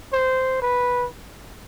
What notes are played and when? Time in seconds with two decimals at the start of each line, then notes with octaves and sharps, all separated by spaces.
0.13 C5
0.62 B4